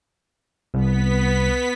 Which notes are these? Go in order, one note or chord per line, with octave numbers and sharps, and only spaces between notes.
C2 B3 B6